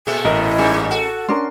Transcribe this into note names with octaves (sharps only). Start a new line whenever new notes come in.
A#2 A3 G#4 A4 G#5
A1 E4 A#4 D#5
G2 G3 C#4 G#4 A#4
F#4 A4
C#4 D4 A#4 C6